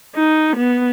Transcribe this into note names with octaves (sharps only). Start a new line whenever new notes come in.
D#4
B3